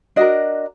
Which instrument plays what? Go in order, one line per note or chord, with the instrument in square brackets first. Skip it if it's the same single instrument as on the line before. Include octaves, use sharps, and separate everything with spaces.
[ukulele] D4 F#4 A#4 D#5